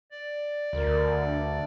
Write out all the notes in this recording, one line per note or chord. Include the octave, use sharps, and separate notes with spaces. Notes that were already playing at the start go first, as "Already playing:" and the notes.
D5
D2 A#4
D4